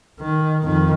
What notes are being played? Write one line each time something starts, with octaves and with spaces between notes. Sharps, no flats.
D#3
F2 D#3